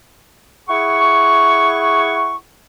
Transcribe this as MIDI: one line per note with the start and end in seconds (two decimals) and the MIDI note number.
0.68 2.36 64
0.68 2.36 68
0.68 2.36 78
0.68 2.36 85